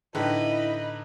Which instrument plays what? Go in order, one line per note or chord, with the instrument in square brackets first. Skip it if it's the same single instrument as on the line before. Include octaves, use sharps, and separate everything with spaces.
[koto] A2 [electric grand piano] D3 D#4 B4 [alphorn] E4 [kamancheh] D#5 B5